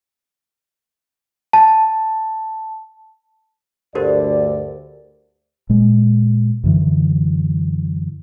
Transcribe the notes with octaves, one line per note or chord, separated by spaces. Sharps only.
A5
D2 G2 D3 G4 A#4 C5 D5
A#2 G#3
F#2 D3 E3